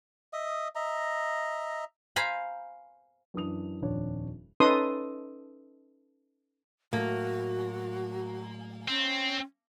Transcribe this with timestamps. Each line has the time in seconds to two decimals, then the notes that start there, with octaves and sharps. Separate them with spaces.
0.33 D#5 E5 D#6
0.75 D#5 E5 A#5
2.16 C5 F5 G#5 A#5 B5
3.34 F#2 E3 D4 D#6 F7
3.82 D#1 F2 D4 C#5
4.60 C#4 D#4 A4 B4 C6 D#6
6.93 A2 F#3 A#3 F#4
8.88 C4 C#4